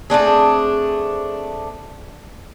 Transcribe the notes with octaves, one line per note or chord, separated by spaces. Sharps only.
A3 C4 D4 G#4